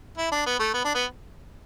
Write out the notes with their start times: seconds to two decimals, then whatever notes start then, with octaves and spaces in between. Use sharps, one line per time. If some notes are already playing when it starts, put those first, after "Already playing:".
0.17 E4
0.32 D4
0.46 B3
0.59 A3
0.74 B3
0.84 D4
0.95 B3